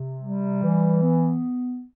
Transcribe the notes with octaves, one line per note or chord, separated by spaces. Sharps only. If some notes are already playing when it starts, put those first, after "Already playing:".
Already playing: C3
G3
E3
B3